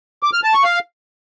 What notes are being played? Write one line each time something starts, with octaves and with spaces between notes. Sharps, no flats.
D6
F6
A5
C#6
F5